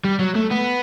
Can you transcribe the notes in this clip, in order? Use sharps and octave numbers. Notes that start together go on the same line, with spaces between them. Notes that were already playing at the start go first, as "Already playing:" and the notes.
G3
F#3
A3
B3